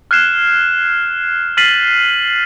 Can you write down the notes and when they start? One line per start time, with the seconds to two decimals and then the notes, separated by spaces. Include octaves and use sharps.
0.11 F6 F#6 G#6 C7 E7
1.57 F6 A6 B6 C7 D#7 F#7